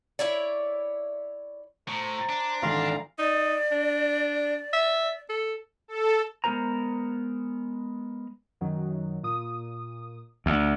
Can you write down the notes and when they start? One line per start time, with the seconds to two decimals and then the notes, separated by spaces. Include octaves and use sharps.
0.19 E4 C#5 D5
1.88 A2 C5 A#5
2.29 D4
2.63 G#1 D3 E3 F5 A#5 C6
3.19 D#4 D5
3.71 D4
4.73 E5
5.29 A4
5.88 A4
6.44 G#3 B3 E4 A#4 C5 A#5
8.61 F#2 D#3 F#3
9.23 A#2 D#6
10.46 D2